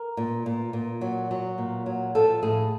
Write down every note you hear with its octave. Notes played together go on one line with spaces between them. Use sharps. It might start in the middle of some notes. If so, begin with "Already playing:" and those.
Already playing: A#4
A#2
A#2
A#2
F#3
F#3
A#2
F#3
F3 A4
A2 G#4